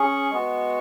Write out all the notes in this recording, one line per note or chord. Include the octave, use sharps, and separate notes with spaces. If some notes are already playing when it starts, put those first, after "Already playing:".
Already playing: C#4 G#4 C#6
G#3 B3 F#4